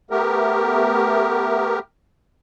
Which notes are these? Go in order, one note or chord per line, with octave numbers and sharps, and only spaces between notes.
A3 B3 G4 A#4